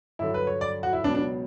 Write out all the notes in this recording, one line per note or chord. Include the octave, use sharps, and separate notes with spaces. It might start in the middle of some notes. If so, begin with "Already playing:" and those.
G2 D3 F#3 E4
B4
C#5
D5
F#4
E4
C#2 B2 F#3 D4
D4